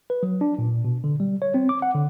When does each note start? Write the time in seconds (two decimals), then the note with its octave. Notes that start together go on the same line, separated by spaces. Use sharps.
0.10 B4
0.23 F#3
0.41 D4
0.58 A#2
0.85 B2
1.04 D3
1.20 G3
1.42 C#5
1.54 C4
1.69 D6
1.82 F#5
1.95 D3